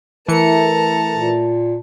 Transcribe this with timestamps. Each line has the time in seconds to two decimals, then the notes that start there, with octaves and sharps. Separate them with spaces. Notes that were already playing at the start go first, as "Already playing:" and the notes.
0.28 E3 A3 A#4 A5 A#5 C#7
1.14 A#2